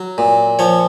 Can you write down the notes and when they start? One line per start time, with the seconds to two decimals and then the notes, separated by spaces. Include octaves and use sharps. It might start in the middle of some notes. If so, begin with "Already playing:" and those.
Already playing: F#3
0.18 A#2
0.59 F3 C#5